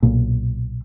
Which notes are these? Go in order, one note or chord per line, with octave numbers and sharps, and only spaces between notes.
B1 A#2